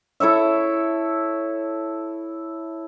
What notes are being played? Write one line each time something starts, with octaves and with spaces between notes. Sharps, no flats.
E4 A4 C#5 E5